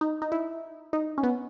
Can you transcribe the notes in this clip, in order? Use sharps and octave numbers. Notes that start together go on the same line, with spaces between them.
D#4
D#4
E4
D#4
C#4
B3